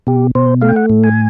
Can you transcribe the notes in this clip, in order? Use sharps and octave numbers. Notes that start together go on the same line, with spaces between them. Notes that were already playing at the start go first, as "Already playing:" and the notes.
B2 G4
B2 C5
A3 F5
G5
F#5
A2
G#5